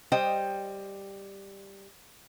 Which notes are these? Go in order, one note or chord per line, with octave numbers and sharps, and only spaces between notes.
G3 C5 D#5 G5